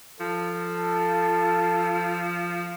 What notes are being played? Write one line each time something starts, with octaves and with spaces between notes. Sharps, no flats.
F3 A4